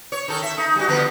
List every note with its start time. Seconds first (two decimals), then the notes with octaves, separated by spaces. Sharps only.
0.12 C#5
0.28 D#3 A4
0.42 E5
0.58 D#4
0.76 G3 F#4
0.88 D3 F3 B3